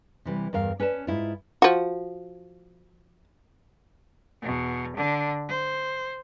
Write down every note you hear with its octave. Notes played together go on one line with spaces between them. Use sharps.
C3 E3 G3
E2 G2 A#4 F5
C#4 B4 D5 A5
G#2 E4 F4
F3 F#4
E2 B2
D3 D4
C5